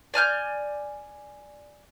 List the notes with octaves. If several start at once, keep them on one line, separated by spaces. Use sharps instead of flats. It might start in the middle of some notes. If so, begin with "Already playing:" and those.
D5 G#5 F6 G6